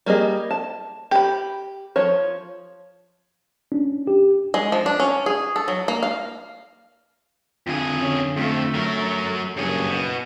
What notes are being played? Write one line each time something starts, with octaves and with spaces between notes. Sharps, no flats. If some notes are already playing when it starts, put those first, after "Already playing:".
G3 A#3 G#4 D#5
A5
G4 B5
F3 C#5
C#4 D4
G4
G#3
F3
D4
C#4
G#4
A4
F#3
A#3
F5
F2 D3 F4 G#4
D3 C#4
F2 F3 A3
F#3 A#4
F#1 G2 G#4 C#5
B2